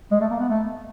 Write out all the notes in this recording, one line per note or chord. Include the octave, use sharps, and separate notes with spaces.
G#3
A3
A#3
B3
A3